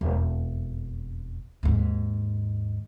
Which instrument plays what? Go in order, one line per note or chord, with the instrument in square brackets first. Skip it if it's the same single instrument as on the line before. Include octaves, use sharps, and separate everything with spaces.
[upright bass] E1 F2
D#2 G#2